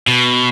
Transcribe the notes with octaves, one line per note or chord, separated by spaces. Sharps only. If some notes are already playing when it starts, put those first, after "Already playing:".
B2